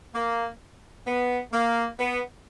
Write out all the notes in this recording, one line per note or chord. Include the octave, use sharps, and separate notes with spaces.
A#3
B3
A#3
B3